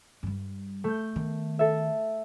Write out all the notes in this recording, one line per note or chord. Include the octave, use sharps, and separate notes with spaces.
G2 G3
A3 G6
D#3 B3
A4 E5